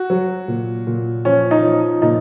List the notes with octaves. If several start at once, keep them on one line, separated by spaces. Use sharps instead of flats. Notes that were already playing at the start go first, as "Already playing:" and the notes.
Already playing: F#4
F#3
A#2
A#2
F3 C#4
D#4
F3
A#2 D#4